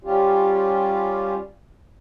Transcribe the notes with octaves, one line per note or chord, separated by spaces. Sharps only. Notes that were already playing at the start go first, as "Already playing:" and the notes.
G3 C#4 F4 G4